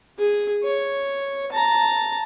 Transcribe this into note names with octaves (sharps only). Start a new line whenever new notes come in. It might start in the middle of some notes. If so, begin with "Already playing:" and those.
G#4
C#5
A5 A#5